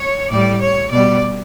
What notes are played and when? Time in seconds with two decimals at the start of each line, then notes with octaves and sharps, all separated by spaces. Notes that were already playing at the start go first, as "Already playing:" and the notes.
Already playing: C#5
0.30 A2 G3 D5
0.61 C#5
0.91 B2 G3 D5